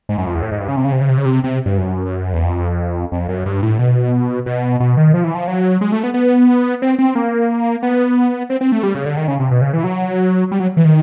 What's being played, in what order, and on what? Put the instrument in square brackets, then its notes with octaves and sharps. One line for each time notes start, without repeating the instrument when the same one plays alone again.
[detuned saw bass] G#2
F#2
F2
E2
A2
G#2
G2
C#3
C3
C#3
C3
C#3
C3
C#3
C3
C3
G2
F#2
E2
F2
F2
F#2
G2
A2
B2
B2
B2
D#3
F3
E3
F3
F#3
G#3
A3
B3
B3
C4
C4
A#3
B3
C4
C4
A3
G3
C#3
D3
D#3
C#3
C3
B2
C#3
E3
F#3
G3
F#3
E3
D#3